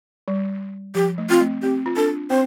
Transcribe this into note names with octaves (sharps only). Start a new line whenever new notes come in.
G3
F3 G4
A3
C4 F4
A3
C4 G4
F4
D4 A4
C4 C5